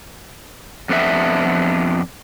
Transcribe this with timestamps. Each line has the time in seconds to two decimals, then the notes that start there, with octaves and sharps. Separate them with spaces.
0.89 F2 B3 D4 E5